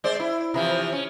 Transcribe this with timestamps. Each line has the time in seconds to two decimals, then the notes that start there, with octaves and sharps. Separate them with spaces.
0.04 G#3 C5 D5
0.20 E4
0.54 C3 E3 F3
0.92 C#4